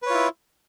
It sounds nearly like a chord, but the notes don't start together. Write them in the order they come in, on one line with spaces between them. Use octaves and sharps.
B4 C#5 F4 E4